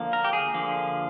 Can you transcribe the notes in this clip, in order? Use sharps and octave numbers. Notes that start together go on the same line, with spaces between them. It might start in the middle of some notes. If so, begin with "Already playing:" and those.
Already playing: D3 F3 A#3
A#4
G4
G#4
D3 F3 A#3